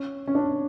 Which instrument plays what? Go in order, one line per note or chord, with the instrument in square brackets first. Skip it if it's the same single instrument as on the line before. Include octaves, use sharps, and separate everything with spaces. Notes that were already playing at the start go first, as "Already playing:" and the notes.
Already playing: [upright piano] C#4
C#4
D4